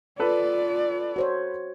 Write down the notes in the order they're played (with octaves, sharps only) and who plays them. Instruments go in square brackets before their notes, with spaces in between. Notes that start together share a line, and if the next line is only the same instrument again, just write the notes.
[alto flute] F4 [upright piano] A4 B4 [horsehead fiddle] D5
[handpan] F#4 C5 C#5